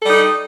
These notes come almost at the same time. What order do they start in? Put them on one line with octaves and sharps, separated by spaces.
A4 G3 D#4